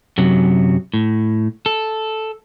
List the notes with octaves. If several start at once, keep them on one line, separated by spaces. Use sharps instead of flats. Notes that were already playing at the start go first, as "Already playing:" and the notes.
F#2 C3 F#3
A2
A4